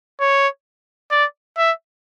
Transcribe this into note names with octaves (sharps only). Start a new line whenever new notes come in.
C#5
D5
E5